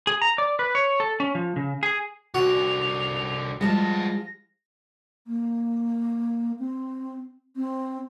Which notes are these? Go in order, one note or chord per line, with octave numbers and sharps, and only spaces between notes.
G#4
A#5
D5
B4
C#5
A4
C#4
F3
C#3
G#4
C2 D3 F#4 F7
F3 G3 G#3 B3 A5 A#6
A#3
C4
C4